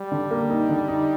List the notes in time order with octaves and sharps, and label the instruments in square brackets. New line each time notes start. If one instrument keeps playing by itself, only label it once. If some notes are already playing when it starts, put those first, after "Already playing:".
Already playing: [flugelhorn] G3
[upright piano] D3
A#3
D#4
D3
D#4